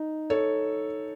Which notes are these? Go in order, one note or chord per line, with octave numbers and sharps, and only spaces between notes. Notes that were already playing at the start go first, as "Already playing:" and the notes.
Already playing: D#4
A4 C#5